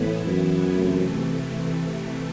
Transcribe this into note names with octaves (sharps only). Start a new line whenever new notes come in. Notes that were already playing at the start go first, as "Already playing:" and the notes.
Already playing: A2 E3 B3 E4
F#2
C3 E3 A3